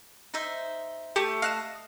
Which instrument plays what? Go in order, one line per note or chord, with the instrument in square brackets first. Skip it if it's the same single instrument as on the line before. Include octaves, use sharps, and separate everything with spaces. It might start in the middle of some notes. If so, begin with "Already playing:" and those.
[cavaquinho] D#4 C5 E5
[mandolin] A3 [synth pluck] G4
[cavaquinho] D#5 [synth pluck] F5 F#6 E7